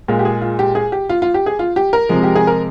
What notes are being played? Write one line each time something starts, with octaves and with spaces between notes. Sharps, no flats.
A#2 G#3 F5
G4
G#4
F4
G4
G#4
G4
F4
F4
G4
G#4
F4
G4
A#4
C3 F3 G#3
G4
G#4
A#4